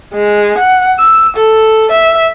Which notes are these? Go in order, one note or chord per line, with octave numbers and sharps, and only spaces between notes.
G#3
F#5
E6
A4
E5